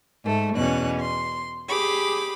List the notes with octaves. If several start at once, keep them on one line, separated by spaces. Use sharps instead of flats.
G#2 A3
E2 B2 C#4 F#6
C6
G4 G#4 B5 D6